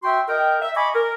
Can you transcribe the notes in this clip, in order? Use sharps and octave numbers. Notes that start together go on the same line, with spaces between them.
F#4 E5 G5 C6
A#4 D#5 G5
E5
D#5 G#5 B5 C#6 D6
A#4